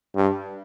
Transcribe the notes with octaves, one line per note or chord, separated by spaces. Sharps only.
G2